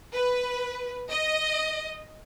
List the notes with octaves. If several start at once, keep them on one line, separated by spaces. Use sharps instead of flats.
B4
D#5